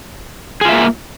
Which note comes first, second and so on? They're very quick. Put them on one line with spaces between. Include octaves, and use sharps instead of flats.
G#4 F4 E5 A#3